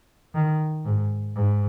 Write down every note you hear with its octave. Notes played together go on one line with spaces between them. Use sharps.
D#3
G#2
G#2